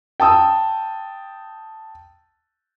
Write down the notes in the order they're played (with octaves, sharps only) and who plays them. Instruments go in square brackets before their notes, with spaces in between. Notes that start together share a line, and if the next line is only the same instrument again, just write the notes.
[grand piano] G5 A5 D#6 E6